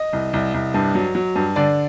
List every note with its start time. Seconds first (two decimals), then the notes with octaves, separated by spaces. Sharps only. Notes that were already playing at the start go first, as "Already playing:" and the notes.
Already playing: D#5
0.13 C2
0.33 C2
0.54 C2
0.74 G2
0.95 F#3
1.15 F#3
1.35 G2
1.56 D3 D5